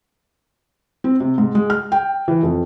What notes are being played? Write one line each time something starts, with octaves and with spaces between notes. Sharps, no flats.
C4
C3
G#2
G#3
F6
G5
E3
F2